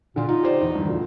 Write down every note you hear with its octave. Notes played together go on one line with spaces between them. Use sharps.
A#2 D3 F4
D#4 F4
G4 C5 D5
E2
G2 D#3
D2 A#2